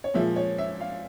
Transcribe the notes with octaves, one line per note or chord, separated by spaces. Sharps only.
C#5
A#2 F3 G#3 E5
C#5
E5
F5